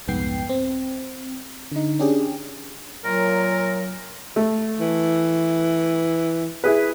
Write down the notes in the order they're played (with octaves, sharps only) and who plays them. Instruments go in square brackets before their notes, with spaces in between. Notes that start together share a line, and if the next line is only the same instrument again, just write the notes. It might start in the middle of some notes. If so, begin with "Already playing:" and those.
[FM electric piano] C2 F2 G#2 B3 G5 C7
C4
D3 D#4
C#4 D4 G4 G#4
[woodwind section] A#2 F#3 [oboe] A#4
[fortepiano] A3
[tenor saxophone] E3
[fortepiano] E4 G#4 B4